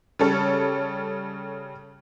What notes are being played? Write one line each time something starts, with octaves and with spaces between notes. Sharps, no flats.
C#3 G3 A4 C#5